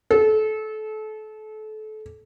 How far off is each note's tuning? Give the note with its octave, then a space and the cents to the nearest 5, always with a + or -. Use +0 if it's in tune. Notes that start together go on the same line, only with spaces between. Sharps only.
A4 -30